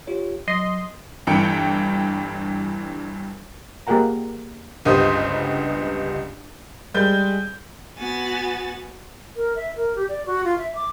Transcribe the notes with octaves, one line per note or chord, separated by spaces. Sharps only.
F4 G4 C#5
F#3 D#5 C6
G1 G2 E3 G5 C#7
A#3 G4 G#4 A#4 F#5 A#5
G1 C#2 B3 G4 C5 D#6
G3 G#3 G6
B3 F#4 G#5 A6
A#4
E5
A#4
G4
D5
F#4
F4
E5
D6